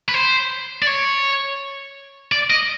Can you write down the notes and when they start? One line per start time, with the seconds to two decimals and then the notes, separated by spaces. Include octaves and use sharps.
0.09 B4
0.14 C5
0.82 D5
0.87 C#5
2.32 D5
2.50 D#5